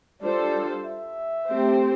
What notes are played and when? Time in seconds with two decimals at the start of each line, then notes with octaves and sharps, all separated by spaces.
0.21 G3 D4 F4 A4 C5 D5
0.85 E5
1.48 A3 C4 G4 C5